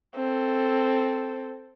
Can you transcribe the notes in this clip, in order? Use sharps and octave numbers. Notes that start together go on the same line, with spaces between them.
C4 A4